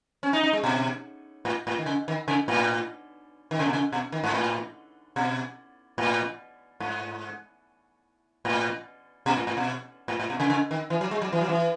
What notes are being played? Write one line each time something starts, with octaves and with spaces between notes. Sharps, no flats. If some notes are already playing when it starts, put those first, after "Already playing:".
C#4
D#4
D#4
G#3
B2
A2
A2
D#3
C#3
D#3
C#3
A2
D#3
C#3
B2
C#3
B2
D#3
G#2
A2
B2
A2
G#2
A2
B2
A2
A2
B2
A2
A2
B2
C#3
C#3
D#3
E3
F#3
G#3
F#3
E3
F#3
E3